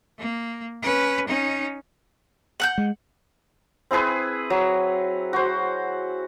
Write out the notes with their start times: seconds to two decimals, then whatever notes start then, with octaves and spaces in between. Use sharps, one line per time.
0.19 A#3
0.82 C#4 B4
1.28 C#4 D#4
2.60 F#5 F#6 G6
2.78 G#3
3.91 C4 E4 G#4 B4
4.50 F#3
5.33 F#4 C5